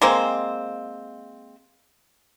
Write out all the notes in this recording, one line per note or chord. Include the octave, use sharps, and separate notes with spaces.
G#3 A#3 C4